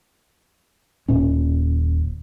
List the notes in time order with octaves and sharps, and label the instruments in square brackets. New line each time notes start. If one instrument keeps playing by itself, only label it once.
[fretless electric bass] D#1 A#2 C#4